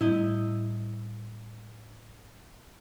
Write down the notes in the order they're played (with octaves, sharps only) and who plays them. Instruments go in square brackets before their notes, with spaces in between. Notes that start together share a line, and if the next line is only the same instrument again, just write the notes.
[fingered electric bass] A2 G3 [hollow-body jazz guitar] E4 D#5